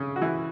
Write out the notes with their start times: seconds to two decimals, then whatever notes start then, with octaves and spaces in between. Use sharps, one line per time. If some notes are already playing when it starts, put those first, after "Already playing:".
Already playing: C#3 C#4
0.16 F#4
0.21 E3 E4